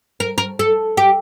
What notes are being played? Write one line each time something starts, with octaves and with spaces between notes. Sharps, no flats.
A#4
A#4
A4
G4